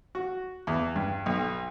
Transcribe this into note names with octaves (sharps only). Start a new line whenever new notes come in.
F#4
E2
G2
B1